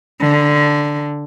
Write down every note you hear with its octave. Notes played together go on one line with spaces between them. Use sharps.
D3